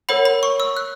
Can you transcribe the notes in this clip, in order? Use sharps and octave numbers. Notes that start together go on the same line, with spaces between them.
A#4 C#5 F#5 B5
B5
C#6
E6
F#6